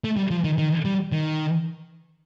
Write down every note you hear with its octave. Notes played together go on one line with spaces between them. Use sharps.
A3
G3
F3
D#3
D#3
G3
D#3